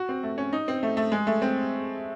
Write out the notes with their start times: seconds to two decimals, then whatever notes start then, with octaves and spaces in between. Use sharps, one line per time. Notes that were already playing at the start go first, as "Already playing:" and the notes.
Already playing: F#4
0.09 C4
0.23 A3
0.38 C#4
0.53 D#4
0.68 C4
0.83 A3
0.97 A3
1.12 G#3
1.27 A3
1.42 C4